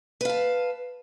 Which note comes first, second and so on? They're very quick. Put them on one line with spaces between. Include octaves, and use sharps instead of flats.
B4 F5 A5